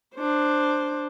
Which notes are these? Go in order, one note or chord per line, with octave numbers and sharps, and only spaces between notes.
D4 C5